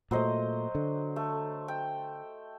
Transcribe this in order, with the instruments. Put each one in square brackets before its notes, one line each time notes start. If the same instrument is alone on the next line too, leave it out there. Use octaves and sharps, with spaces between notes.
[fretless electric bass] A#2 A3 [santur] F#3 C5 D#5
[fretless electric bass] D3
[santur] A3
G5